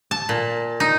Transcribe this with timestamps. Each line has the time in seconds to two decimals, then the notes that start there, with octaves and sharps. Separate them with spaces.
0.11 A5
0.29 A#2
0.80 D#4